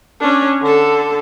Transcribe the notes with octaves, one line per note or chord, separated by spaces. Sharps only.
C#4 D4
D3 A4